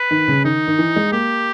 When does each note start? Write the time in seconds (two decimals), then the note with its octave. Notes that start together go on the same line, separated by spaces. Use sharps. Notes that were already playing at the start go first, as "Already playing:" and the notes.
Already playing: B4
0.11 D#3
0.28 C#3
0.44 D#3 D#4
0.67 D#3
0.78 E3
0.96 G#3
1.12 A#3 G4